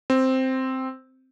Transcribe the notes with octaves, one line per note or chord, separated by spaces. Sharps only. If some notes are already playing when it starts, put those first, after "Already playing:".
C4